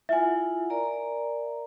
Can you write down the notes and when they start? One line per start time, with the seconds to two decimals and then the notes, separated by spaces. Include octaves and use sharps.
0.09 E4 F4 E5 F#5 G#5
0.70 A#4 D5 A#5